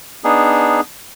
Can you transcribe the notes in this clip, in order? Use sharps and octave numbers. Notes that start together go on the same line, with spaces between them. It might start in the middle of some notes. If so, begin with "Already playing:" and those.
B3 D4 D#4 G#4